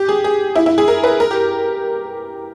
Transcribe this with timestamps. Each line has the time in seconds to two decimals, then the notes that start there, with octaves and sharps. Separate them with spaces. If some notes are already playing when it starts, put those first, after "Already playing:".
Already playing: G4
0.09 G#4
0.24 G#4
0.56 E4
0.66 E4
0.78 G#4
0.88 A#4
1.04 B4
1.20 A#4
1.31 G4